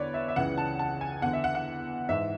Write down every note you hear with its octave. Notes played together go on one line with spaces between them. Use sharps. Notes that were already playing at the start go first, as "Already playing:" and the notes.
Already playing: E2 D3 B4 C#5 D5
E5
E5
C#2 C#3 E3 F#5
A5
A5
G#5
E2 D3 F#5
E5
F#5
F#5
G#2 E3 E5